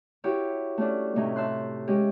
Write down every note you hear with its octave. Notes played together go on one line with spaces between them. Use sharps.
E4 F#4 G4 C#5
A3 C#4 D4
A2 C3 A3 C#4 D#4
E5 A5 C6 F#6
G#3 C#4 G4